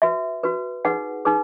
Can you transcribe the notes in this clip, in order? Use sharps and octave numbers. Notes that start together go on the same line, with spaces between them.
F#4 B4 E5
F#4 B4
D#4 G#4 B4 F#5
D#4 G#4 B4